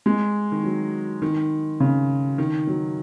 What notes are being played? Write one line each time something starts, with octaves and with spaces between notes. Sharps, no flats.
G#3
D#3
F#3
D#3
C#3
D#3
F#3